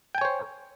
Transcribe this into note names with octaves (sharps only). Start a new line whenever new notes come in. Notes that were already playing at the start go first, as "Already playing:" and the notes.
C5 C#5 G5 G#5